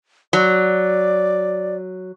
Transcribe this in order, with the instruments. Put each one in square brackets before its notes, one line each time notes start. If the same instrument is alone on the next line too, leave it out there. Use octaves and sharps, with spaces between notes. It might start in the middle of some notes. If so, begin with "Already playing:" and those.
[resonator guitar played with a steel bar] F#3 [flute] D5